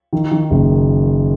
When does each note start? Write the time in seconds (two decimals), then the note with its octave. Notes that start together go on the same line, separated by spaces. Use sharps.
0.13 D#3
0.31 D#3
0.50 F#1